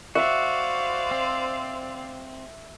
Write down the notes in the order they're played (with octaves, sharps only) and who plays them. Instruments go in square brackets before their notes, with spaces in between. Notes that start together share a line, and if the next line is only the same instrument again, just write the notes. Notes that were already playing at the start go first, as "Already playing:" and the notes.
[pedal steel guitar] F#4 [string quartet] C5 D5 F5 [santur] E5
[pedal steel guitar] C4